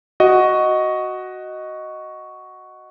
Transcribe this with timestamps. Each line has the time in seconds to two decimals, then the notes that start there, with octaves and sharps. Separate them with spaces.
0.20 F#4 D#5